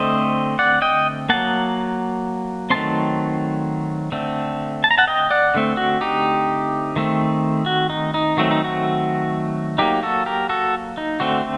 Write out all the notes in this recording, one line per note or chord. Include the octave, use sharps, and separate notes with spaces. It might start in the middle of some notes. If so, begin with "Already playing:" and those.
Already playing: D3 A3 C4 C5 D#5
D5 F#5
D#5 G5
F#3 A#3 F#5 A5
D#3 F#3 A3 C4 A5 C6
D3 A3 C4
A5
A#5
F#5 A5
D#5 G5
D5 F#5
D3 A3 C4
F#4
D#4 G4
D#3 A3 C4
F#4
D#4
D#4
D#3 F#3 A3 C4 F#4
D#4
F#4
F#3 A#3 D#4 G4
F#4 A4
G4 A#4
F#4 A4
D#4
D3 A3 C4 F#4